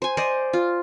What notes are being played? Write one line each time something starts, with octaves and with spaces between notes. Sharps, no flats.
C5 G#5
C5 D5 D#5
F4